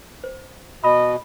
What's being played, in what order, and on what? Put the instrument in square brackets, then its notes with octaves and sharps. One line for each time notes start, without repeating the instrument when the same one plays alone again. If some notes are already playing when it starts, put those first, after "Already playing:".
[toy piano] C5
[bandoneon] B2 [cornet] D#5 [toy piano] B5